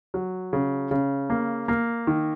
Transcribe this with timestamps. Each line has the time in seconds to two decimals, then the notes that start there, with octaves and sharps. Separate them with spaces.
0.14 F#3
0.53 C#3
0.91 C#3
1.30 A#3
1.68 A#3
2.07 D#3